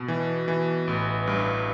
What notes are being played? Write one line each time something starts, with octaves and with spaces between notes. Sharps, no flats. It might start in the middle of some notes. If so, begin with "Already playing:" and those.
Already playing: B2
E3
E3
A1
G2